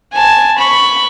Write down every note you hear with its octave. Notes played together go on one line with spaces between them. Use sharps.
G#5 A5
B5 C#6